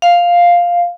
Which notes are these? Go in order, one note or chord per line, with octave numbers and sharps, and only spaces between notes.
F5